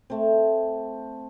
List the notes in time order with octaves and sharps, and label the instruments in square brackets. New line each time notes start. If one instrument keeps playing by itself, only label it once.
[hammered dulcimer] A3 C4